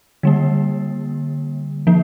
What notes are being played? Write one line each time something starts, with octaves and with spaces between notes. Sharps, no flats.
D3 G3 A#3
F3 A#3